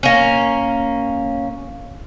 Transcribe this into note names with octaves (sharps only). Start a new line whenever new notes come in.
A#3 C#4